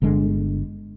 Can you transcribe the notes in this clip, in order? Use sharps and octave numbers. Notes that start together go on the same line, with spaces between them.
G1 D3 G#3 D4